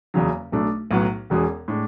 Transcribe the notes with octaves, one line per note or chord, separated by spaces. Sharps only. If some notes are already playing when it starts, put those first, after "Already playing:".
F#1 E2 C#3 F#3
B1 B2 A3 D4
B1 A2 F#3 B3
E1 E2 B2 G#3 C#4
A2 G#3 D4